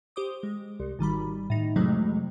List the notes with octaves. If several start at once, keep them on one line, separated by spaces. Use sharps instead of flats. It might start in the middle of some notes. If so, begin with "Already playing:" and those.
G4 C5 D6 D#6
G#3
C2
G#1 D#3 G3 B5
A2 D#4
F2 C3 E3 F#3 G#3 A3